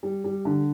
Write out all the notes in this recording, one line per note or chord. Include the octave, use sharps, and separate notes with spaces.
G3
G3
D3